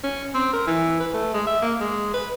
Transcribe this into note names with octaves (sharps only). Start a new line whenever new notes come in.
C#4
C4
A#4
E3
B4
A3
G#3
E5
A#3
G#3
B4